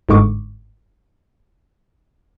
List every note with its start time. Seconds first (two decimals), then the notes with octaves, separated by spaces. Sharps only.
0.09 G1 G#2 D3 G#3 C#6 D6